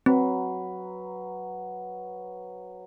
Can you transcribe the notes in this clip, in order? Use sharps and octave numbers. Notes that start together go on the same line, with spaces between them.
F#3 C4 B4